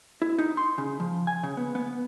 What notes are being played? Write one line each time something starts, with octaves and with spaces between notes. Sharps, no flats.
E4
D#4
C6
C#3
F3
G#5
C#3
B3
B3